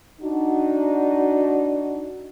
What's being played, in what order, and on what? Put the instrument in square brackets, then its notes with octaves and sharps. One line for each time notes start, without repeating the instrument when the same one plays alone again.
[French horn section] D4 D#4 F#4